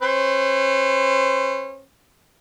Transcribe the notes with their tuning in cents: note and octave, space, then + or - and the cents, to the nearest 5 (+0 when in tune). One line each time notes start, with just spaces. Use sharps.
C#4 -40 C5 -30